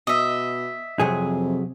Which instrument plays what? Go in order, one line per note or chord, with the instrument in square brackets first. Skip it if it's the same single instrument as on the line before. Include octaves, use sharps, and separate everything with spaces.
[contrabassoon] B2 [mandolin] D#5 E5
[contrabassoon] F2 [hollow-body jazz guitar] C3 F#3 G#4